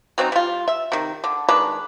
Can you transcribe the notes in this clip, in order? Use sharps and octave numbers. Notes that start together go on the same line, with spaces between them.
F#3 C4 C#4 D#4
G3 F4
E5
C3 D#3
D3
D#3 G#3 D4 B4